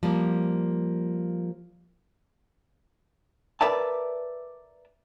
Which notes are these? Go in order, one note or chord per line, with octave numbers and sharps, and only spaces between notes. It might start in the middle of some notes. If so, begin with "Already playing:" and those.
F3 G3 A#3
A#4 B4 D5 E5 A5